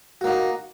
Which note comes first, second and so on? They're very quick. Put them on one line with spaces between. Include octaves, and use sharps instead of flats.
F#4 A#3 D#4